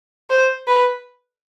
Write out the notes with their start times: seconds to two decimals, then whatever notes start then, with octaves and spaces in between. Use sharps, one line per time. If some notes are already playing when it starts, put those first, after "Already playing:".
0.30 C5
0.67 B4